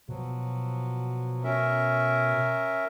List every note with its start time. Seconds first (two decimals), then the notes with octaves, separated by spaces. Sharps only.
0.09 B2 F3 F#3
1.44 C#4 A#4 E5